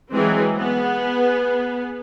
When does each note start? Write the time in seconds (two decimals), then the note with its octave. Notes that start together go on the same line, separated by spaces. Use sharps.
0.13 E3 F#3 G#3 C4 G#4
0.58 B3 G#4